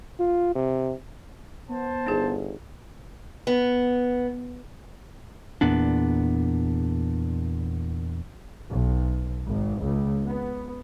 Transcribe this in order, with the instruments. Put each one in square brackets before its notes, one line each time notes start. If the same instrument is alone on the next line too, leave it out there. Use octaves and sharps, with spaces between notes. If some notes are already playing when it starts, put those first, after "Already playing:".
[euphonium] F4
C3
[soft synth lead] B3 [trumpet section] C5 A5
[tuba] G1 [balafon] D#4 G#4
[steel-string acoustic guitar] B3
[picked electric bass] E2 A#2 B3 D4
[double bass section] B1
G#1
C#2
B3